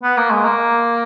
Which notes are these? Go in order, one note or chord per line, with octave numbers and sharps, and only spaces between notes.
B3
A#3
G#3
A#3